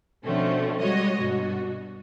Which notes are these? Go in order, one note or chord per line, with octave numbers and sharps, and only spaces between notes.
B2 D3 F3 A3 C4 C#4
G3 G#3 F#4 C#5 D#5
G2 B2 F#4